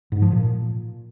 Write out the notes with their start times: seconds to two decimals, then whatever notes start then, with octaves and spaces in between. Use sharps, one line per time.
0.12 G#2
0.22 F3
0.32 A#2